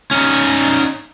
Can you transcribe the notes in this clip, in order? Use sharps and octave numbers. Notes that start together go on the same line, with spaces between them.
C#4 D#4